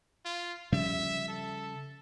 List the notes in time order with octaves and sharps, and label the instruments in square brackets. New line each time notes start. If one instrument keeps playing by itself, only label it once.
[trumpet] F4
[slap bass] C#3 F3 G3 [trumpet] E5
[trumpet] A4